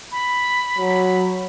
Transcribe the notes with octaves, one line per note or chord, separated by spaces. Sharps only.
B5
F#3